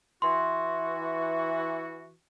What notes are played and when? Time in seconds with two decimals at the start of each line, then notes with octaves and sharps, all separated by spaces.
0.22 E3 F#4 C6